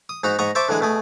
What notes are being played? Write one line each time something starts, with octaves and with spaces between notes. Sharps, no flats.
D#6
G#2 D#4 F#4 A#5
G#2 D#5 F#5 A#5 C#6
C5 E5 A5 C#6 D6
D3 E3 G#3 G#4
B2 A3 G#4